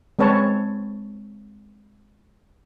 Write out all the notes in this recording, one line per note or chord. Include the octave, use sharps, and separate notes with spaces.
G#3 C4 B4 C#5 A5